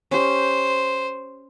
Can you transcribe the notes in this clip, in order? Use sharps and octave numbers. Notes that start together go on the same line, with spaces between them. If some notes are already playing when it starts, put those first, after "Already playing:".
C#4 G4 C5